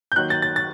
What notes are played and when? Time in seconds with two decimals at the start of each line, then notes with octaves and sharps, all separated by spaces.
0.12 G6
0.16 D#2 D#3 F#3 A#3 F#6
0.30 A6
0.42 A6
0.56 A6